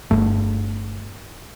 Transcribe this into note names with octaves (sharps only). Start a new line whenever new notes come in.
G1 G2 A3